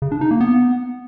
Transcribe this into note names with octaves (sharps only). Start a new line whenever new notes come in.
C#3
D4
D#4
A#3
B3